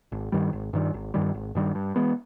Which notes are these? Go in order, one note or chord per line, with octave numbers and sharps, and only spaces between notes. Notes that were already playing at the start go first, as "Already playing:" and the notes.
G#1
G2 D#3 G3
G#1
G2 D#3 G3
G#1
G2 D#3 G3
G#1
G2 D#3 G3
G2
E3 G#3 B3